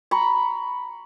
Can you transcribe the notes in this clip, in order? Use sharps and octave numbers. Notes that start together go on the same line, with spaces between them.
A#5 B5 C#6